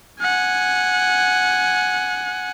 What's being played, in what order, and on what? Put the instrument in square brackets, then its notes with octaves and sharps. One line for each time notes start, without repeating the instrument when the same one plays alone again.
[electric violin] F#5 G#5